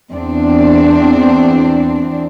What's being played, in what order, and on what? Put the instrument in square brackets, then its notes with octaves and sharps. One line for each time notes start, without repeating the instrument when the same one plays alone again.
[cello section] E2 C4 D4